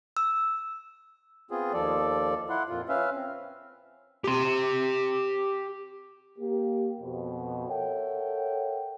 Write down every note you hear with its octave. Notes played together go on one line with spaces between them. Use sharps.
E6
B3 C4 F4 G#4
D#2 F3 A4 D5
E4 F#5 C6
F2 A#2 F4
C#4 B4 E5 F5
C4
G4 C6
A#3 G4
F2 B2
A4 A#4 C#5 E5 F#5 G5